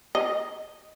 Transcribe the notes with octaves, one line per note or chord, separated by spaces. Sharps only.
D#5